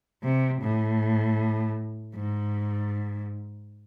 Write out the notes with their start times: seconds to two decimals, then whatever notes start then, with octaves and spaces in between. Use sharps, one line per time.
0.23 C3
0.62 A2
2.15 G#2